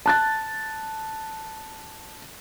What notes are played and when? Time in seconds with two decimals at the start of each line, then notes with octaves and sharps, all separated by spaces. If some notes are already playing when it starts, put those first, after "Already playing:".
0.06 A5 F#6 A6